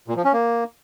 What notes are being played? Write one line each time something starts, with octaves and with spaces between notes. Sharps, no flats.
A#2
F3
C#4
A#3